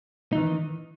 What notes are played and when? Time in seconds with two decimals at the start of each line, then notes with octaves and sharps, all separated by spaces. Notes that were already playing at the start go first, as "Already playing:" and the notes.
0.33 D#4
0.35 E3
0.38 D#3